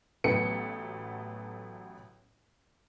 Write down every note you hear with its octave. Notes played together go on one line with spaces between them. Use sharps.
A1 F#3 A3 B3 G5 C#7